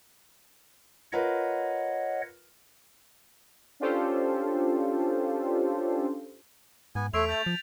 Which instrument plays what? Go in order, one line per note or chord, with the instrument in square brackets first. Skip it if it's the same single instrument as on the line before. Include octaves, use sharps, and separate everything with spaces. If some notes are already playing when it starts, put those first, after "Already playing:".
[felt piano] F4 A#4 B4 [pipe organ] C#5 D#5 F#5
[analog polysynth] C#4 D4 F4 G4 A4 C5
[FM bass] G#2 [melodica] B3 G#5
[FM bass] E2 [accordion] A3 [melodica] C#5 E5 C6 [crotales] B6 D7 F7
[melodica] A5 [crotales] G6 A6 F7
[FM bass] F3